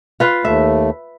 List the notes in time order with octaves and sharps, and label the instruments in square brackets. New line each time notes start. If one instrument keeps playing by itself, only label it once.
[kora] F4 B4 F5
[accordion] D#2 A3 [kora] E5